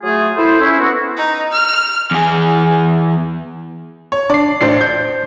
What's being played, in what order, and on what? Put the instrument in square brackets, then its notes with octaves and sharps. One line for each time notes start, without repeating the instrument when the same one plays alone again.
[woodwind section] F#3 A3 F4 G#4
E4 A4 C5
C#4 E4
B3 F#4
[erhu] D#4
F6
[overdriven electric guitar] E2 G#4
[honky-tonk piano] C#5
[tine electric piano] D4 C7 [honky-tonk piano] D5
[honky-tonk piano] A1 D4 [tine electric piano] C5 C7
[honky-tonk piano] G6